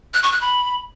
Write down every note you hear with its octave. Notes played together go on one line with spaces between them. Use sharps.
F#6
C#6
F#6
B5